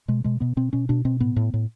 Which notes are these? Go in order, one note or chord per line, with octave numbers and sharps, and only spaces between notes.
B2 G#3
B2 G#3
B2 B3
B2 C4
B2 C#4
B2 D4
B2 C4
A2 B3
A2
A2